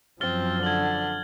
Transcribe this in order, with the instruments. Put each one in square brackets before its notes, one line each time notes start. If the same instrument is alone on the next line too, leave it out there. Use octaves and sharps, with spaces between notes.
[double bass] F#2 F3 [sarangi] C4 [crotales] F6 A6 G7
[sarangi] D3 [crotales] G#6 F#7